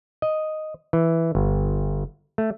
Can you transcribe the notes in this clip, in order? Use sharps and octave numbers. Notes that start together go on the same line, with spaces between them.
D#5
E3
G1
A3